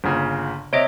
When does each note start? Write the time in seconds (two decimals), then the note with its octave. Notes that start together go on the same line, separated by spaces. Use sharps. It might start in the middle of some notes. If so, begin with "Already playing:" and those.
0.04 G1 A#2 C#3
0.73 C3 C#5 D#5 E5 D7